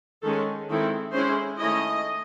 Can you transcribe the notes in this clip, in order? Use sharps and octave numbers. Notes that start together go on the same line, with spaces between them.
D#3 G#3 C#4 A4
D#3 G#3 C4 E4 A4
G#3 C#4 E4 C5
D#3 A3 C#4 E4 D#5